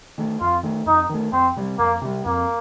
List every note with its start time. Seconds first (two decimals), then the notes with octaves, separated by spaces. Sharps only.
0.18 D#3 A3
0.40 F2 F4
0.63 D#3 A3
0.86 F2 D#4
1.09 D#3 A3
1.33 F2 C4
1.57 C3 G3
1.79 F2 A#3
2.02 C3 G3
2.25 F2 A#3